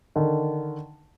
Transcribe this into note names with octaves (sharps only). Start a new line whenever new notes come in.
D3 D#3